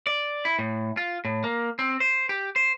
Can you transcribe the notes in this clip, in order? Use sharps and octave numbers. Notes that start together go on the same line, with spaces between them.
D5
E4
A2
F4
A2
A#3
C4
C5
G4
C5